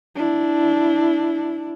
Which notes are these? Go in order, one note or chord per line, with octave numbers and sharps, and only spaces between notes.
D4 E4